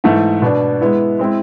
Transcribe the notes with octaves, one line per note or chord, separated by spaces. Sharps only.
G#2 E3 A3
B2 B3 D4
G#3 B3 E4
G#3 C4 E4